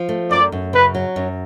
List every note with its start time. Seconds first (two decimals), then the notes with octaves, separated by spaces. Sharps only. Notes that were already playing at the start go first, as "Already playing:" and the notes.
Already playing: F3
0.09 A3
0.31 F#2 D5
0.52 F#2
0.73 C#3 B4
0.95 F#3
1.16 F#2